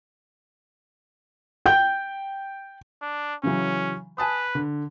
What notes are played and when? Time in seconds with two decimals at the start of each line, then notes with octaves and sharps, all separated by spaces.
1.66 G5 G6
3.02 D4
3.43 C#3 E3 F#3 C#4
4.18 B4 G#5 A5 D#6
4.55 D3